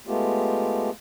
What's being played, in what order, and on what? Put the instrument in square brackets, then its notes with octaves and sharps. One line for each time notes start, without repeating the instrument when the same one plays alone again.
[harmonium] G#3 A3 B3 F4 G4